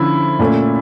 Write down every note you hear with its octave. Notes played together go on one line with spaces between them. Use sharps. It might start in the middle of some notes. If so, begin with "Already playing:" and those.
Already playing: D3 F3 C#4 E4
A#2 A3 C#4